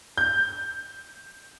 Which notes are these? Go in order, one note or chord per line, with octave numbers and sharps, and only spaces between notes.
G6